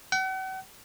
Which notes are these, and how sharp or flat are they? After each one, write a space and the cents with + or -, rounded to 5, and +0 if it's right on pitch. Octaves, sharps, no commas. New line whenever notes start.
F#5 +40